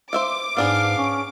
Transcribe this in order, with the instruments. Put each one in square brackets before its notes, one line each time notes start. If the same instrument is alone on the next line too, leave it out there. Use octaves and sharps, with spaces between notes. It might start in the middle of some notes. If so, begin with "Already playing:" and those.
[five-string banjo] C5 E5 F5 [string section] D6
[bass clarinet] G#2 [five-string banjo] B3 D4 G#4 [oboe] F5
[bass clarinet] C#4